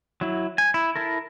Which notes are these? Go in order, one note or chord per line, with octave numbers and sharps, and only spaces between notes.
F#3 E4
G#5
E4
E4 A4 A#4